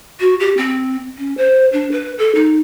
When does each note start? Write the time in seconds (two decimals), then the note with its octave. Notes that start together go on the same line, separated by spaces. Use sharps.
0.20 F#4
0.40 G4
0.57 C4
1.17 C#4
1.37 C5
1.72 D4
1.91 B4
2.18 A4
2.34 D#4